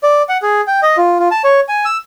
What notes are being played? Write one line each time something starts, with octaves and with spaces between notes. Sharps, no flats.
D5
F#5
G#4
G5
D#5
F4
F4
A5
C#5
G#5
E6